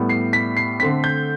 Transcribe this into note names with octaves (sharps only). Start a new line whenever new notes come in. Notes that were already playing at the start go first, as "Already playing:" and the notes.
Already playing: A2 G3 B3
C7
B6
C7
D3 A3 C4 B6
G6